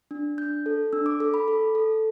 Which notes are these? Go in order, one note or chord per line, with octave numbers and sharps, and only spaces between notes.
D4
D4 G6
A4
D4 E6
D6
A4 D6
B5
A4
A4